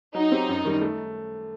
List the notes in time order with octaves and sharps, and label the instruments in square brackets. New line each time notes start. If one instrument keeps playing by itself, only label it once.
[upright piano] F#3 [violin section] D#4
[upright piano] C4 G4
F#2
D#3 G3
A3